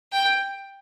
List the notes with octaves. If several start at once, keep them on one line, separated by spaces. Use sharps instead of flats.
G5